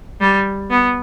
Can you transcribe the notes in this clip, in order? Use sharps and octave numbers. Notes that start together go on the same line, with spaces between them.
G3
B3